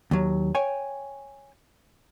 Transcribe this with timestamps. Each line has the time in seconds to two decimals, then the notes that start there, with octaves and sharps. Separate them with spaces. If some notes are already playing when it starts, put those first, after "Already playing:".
0.11 D#2 F#3
0.55 C#5 G5 G#5